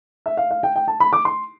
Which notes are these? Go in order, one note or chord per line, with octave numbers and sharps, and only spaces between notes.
E5
F5
F5
G5
G5
A5
B5
D6
C6